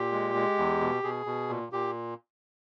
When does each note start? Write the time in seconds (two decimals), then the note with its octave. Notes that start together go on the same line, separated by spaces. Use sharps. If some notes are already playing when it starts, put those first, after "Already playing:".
Already playing: A#2 G4
0.12 G#3
0.35 G#3
0.58 E2
0.81 B2
1.04 B2 G#4
1.26 B2
1.49 A#2
1.72 A#2 G4